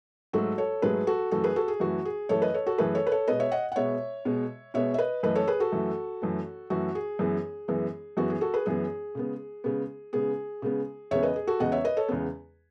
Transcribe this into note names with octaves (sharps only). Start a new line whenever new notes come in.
G#2 F#3 A3 F#4 A4
A4 C#5
G#2 F#3 A3 G#4 B4
F#4 A4
F#2 E3 A3 F#4 A4
G#4 B4
F#4 A4
G#4
F#2 E3 A3 F#4
G#4
F#2 E3 A3 A4 C#5
B4 D#5
A4 C#5
F#4 A4
F#2 E3 A3 G#4 B4
A4 C#5
B4
A4 C#5
B2 G#3 B3 B4 D#5
C#5 E5
D#5 F#5
F#5
B2 G#3 B3 C#5 E5
B2 G#3 B3
B2 G#3 B3 C#5 E5
E5
B4 D#5
F#2 E3 A3 B4 D#5
A4 C#5
G#4 B4
F#4 A4
F#2 E3 A3
F#2 E3 A3
F#2 E3 A3 F#4
G#4
F#2 E3 G#3 B3
F#2 E3 G#3 B3
F#2 E3 G#3 B3 F#4
G#4
F#4 A4
G#4 B4
F#2 E3 G#3 B3 G#4
C#3 G#3 B3
C#3 G#3 B3
C#3 G#3 B3 G#4
C#3 G#3 B3
E2 C#3 G#3 B3 C#5 E5
B4 D#5
G#4
F#4 A4
E2 C#3 G#3 B3 D#5 F#5
C#5 E5
B4 D#5
A4 C#5
E2 C#3 G#3 B3